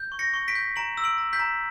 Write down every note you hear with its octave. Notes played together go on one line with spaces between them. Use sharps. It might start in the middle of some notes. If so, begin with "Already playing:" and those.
Already playing: G6
C#6
A#6 C#7
C#6
B6 D7
G6
A#5 D7 F#7
E6
D7 F#7
A#5
G6 B6
A#5